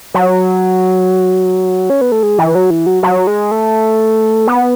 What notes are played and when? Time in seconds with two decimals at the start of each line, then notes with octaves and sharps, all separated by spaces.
0.14 F#3
1.90 C#4
2.01 B3
2.12 A3
2.23 G#3
2.38 E3
2.55 F#3
2.70 E3
2.86 F#3
3.03 F#3
3.27 G#3
3.51 A3
4.47 B3